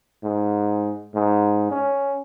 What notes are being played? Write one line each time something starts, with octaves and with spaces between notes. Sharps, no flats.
G#2
G#2
C#4